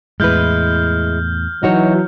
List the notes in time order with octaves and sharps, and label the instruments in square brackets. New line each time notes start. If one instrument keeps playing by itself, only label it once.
[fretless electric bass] E2 A2 [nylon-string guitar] G#3 E4 B4 [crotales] F6 G6
[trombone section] E3 F#3 [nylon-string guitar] D#4 F#4 C#5